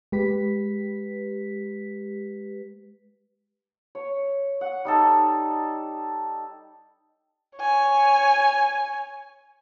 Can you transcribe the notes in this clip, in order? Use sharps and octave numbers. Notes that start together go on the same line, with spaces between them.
G#3 G4 B4 B6
C#5
F#5
G3 D#4 A4
C#5 G#5